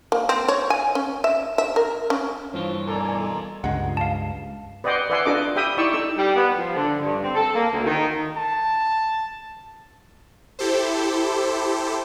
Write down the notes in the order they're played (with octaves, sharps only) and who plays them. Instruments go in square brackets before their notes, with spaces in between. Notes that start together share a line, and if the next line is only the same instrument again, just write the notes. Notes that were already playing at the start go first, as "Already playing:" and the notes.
[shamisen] A#3
C4
C#5
G#5
C#4
E5
E5
A#4
C#4
[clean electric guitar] G2 E3 F4 [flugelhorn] F3 [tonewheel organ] C#5
[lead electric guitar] B2 A#5 [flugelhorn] A4 [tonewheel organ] A#4 D5 G#5
[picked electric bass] C#2 G2 G#3 [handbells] F#5
[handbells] F5 A5
[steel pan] B4 D5 D#5 F#5 G5 C6
B4 D5 E5 F#5 G#5 C6
D4 F4 A4 B4 D#5 D6
G4 E5 G5 B5 D#6
D#4 E4 D5 G5 C#6 E6
D#4 A4 E6
[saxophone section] G3
B3
F3
D3
G2
C4
A4
A#3
D2
D#3
[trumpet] A5
[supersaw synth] E4 G4 A4 C5